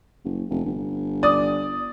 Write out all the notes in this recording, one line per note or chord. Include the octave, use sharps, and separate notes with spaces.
F#1
F1
G1
D5 D#6